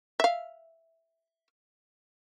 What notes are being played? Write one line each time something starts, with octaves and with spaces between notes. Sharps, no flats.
E5 F5